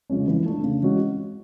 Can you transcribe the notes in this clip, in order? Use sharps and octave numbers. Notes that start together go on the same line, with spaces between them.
C#3 F3 G#3 C#4
E3
A3 D4
C#3
E3 G#3 C#4 F#4